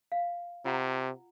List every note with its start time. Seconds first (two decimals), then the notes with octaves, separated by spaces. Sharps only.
0.12 F5
0.65 C3 F4 F#5 A#5